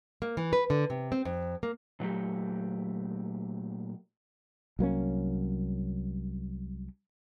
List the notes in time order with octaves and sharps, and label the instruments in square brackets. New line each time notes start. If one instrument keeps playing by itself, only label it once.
[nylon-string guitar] A#3
E3
B4
D3
C3
C4
F2
A#3
[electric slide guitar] A#2 F#3 A3 G4
[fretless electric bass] C2 F#3 A#3 C#4